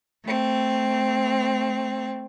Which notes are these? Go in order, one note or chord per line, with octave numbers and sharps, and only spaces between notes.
A3 C4